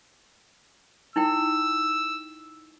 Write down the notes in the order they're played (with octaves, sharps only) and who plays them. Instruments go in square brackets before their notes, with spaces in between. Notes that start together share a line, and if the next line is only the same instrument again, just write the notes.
[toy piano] D#4 E4 G5 [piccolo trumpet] E6